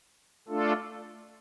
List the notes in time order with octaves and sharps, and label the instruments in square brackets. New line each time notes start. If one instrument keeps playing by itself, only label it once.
[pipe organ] A3 D4 F4 A4